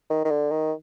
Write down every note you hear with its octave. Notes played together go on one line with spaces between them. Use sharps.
D#3
D#3
D3
D#3